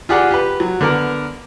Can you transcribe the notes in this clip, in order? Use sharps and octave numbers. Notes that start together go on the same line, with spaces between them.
F4 G4 G#4 D5 F#5
G4 B4
F#3
D3 B3 A#4